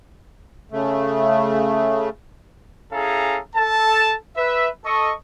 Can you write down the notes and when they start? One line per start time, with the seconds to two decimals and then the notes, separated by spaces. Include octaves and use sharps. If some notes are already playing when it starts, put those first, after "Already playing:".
0.72 C#3 A3
2.92 C#4 E4 G#4 A4 F5 A#5
3.56 A4 A5
4.37 B4 E5
4.85 A4 D#5 C#6